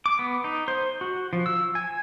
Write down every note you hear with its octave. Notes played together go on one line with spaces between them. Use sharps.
D6
B3
D#4
C5
F#4
F3
E6
G#5